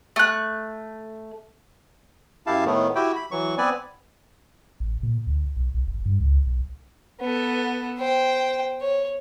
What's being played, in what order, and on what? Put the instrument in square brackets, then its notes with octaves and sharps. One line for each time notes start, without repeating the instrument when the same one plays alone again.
[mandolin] A3 F#6
[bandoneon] F#2 E4 G4 F5 A5
A2 D#3 A3 B3
E4 F#4 G4 G5
B5
E3 F#3 C#6
B3 C4 B4 D5 G#5
[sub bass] A1
A#2
D2
B1
B1
G1
G2
C#2
B1
[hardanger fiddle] B3 A4
C5 G5
C#5